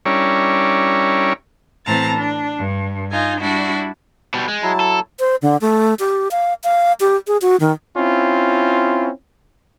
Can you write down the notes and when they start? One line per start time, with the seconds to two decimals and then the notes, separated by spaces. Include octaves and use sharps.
0.06 G3 C#4 D4 E4 A#4 C#5
1.86 A2 E3 C4 A5 A#5 A6
2.17 D4
2.58 G2
3.11 D#4 F4 G#5
3.40 G3 D4 E4 F#4
4.34 B2 G3
4.48 G#3
4.63 F#3 E4 A5
4.80 A4
5.19 C5
5.42 D3
5.61 A3
5.99 G4
6.31 F5
6.64 F5
7.00 G4
7.27 G#4
7.42 F#4
7.60 D#3
7.97 C4 C#4 E4 F4